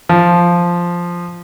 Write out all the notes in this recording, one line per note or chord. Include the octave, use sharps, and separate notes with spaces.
F3